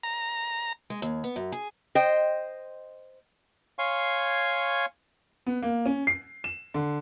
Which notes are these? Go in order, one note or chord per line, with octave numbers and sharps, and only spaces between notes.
A#5
G#3
D#2
B3
F#2
G#4
C5 D#5 G5
C#5 F5 G#5 C6 C#6
B3
A#3
C#4
C7
E7
D3